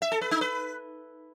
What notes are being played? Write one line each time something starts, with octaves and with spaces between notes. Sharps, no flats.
E5
A4
B4
D#4
B4